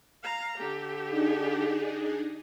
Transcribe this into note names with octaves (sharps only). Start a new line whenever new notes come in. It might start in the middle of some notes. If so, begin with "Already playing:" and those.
F5 A#5
D3 G4
D4 D#4 G#4